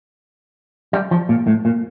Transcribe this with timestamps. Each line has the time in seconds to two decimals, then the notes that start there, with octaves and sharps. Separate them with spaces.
0.93 G3
1.11 F3
1.29 A#2
1.47 A2
1.65 A#2